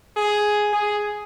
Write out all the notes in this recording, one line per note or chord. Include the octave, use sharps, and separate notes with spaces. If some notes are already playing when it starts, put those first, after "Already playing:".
G#4
G#4